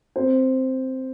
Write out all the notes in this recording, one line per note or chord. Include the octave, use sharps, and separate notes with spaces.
C4 C5